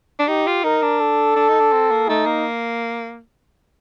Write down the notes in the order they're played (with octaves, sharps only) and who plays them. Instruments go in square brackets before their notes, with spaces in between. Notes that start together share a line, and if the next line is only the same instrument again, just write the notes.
[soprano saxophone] D4
[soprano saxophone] D#4 [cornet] G4
[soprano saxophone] F4
[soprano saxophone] D#4 [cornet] A#4
[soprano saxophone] D4
[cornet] A4
[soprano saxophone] D4
D#4
D4
C4
A#3
[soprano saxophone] A3 [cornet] D#4
[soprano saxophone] A#3